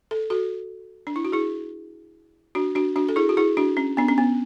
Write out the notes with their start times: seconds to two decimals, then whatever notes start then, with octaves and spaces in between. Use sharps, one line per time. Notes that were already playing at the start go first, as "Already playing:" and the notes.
0.11 A4
0.30 F#4 A4
1.07 D4
1.16 E4
1.25 F#4
1.32 E4 G#4
2.55 D4 F#4
2.75 D4 F#4
2.96 D4 F#4
3.09 A4
3.16 E4 G#4
3.29 F#4
3.37 E4 G#4
3.57 D4 F#4
3.77 C#4
3.97 B3 D4
4.08 C#4
4.18 B3